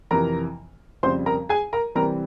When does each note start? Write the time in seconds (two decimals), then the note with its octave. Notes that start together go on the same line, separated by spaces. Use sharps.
0.11 F2 C3 E3 A#4 A#5
1.03 F2 C#3 G3 C4 C5 C6
1.26 A#4 A#5
1.49 G#4 G#5
1.73 A#4 A#5
1.95 C3 E3 G3 C4 A#4 A#5